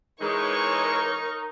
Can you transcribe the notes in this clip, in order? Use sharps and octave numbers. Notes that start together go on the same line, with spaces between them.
E3 G#3 D#4 A#4 C#5 C#6